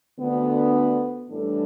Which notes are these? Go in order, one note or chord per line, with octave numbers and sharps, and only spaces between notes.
D2 D3 B3
A2 E3 G3 D4 A4